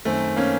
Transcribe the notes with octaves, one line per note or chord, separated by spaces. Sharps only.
F#2 D#3 A3 C4
A#3 C#4